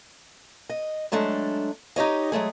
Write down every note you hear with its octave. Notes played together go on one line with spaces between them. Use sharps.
D#5
F#3 G#3 A3 D4
D#4 G4 C#5 D#5
F#3 G#3 A3 G#4